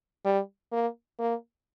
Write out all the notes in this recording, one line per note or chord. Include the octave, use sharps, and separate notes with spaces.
G3
A#3
A#3